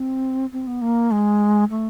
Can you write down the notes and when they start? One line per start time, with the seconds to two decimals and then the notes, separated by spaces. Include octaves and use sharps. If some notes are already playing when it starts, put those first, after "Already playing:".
Already playing: C4
0.52 C4
0.67 B3
0.81 A#3
1.11 G#3
1.70 A3